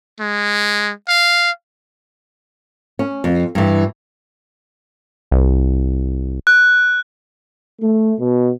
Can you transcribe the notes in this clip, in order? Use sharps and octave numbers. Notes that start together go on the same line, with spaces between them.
G#3
F5
C#4
F2
G2 E3
C2
F#6
A3
B2